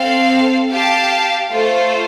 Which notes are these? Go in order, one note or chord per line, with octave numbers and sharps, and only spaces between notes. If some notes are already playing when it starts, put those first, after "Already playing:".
Already playing: C4 A4 F5
G4 F5 A5
A3 F4 A4 C5